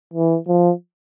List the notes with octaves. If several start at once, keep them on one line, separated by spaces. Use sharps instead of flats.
E3
F3